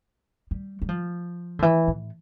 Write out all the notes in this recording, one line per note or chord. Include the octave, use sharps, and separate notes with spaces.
G3
G3
F3
D3
E3
A2